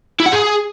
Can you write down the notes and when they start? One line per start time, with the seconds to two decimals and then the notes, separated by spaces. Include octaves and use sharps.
0.20 E4
0.26 F#5
0.32 G#4